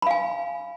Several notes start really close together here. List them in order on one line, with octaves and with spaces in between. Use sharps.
B5 F5 G#5